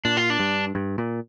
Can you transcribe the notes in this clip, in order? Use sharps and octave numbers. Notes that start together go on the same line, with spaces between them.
A#2 D4
F4
D4
G2
G2
A#2